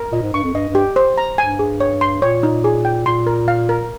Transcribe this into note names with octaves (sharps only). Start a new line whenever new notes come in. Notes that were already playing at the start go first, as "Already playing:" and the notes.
Already playing: A#4
A#2 D#5
G#2
G2 C#6
F2
G2 D#5
G2
G4
C5
A#5
G2 G#5
G#4
C#5
C6
A#2 C#5
D#4
G#4
G5
A#2 C6
A#4
F5
A#4